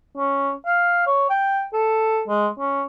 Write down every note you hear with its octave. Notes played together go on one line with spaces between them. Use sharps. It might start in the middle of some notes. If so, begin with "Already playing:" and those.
C#4
F5
C#5
G5
A4
G#3
C#4